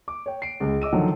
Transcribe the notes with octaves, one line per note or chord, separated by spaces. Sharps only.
D6
C#5 G5
C7 D7
C#2 G#4
D#5 D6 E6 D#7
D3 D#3 F3 F#3